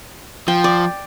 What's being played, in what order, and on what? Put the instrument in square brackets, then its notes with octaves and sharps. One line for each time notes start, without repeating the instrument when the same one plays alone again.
[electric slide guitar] F3 [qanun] G5
[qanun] D5